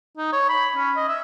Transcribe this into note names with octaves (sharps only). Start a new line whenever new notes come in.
D#4
C#5
B5
C#4
D#5
E5